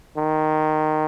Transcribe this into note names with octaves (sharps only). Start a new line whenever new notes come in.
D#3